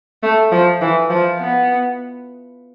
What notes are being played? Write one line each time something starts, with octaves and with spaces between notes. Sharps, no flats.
A3
F3
E3
F3
B3